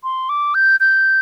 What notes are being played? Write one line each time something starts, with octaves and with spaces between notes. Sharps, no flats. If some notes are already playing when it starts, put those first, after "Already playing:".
C6
D6
G6
G6